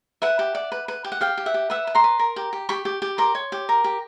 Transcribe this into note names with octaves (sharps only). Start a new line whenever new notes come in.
B4 E5 F#5
G4
D5
B4
B4
G4
F#5
G4 F5 G5
G4
E5 F#5
G4
B4 E5 F#5
B4
A#5 C6
B4
A#4
G4
G4
G4 B5 C#6
G4
G4
A#4 C6 D6
C#5
G4
A#4
G4